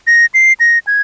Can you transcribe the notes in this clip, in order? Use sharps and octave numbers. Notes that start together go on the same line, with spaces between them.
A#6
C7
A#6
G#6